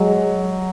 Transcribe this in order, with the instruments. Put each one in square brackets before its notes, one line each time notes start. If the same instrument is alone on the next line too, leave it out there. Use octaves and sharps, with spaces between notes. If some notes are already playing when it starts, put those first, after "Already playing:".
Already playing: [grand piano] F#3 [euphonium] G#3